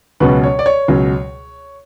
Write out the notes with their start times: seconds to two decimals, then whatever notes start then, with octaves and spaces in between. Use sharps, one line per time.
0.20 C#2 B2 F#3 C#4 B4
0.44 C#5
0.59 D5
0.66 C#5
0.88 C#2 B2 F#3 C#4